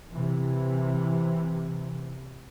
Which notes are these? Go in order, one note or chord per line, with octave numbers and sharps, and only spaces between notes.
C3 E3